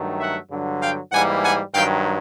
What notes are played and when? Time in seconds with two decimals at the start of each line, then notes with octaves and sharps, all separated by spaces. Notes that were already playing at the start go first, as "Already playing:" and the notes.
Already playing: G2 D#3 F#3 A3
0.19 E5 F#5
0.50 G2 D3 F#3
0.81 F5 G5
1.12 G#2 E3 G3 A#3 F#5 G#5
1.43 F#5 G#5
1.75 G2 D#3 F#3 F5 G5